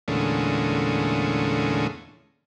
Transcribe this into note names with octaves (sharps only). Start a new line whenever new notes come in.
E2 A#2 D3 G#3 A3 C#4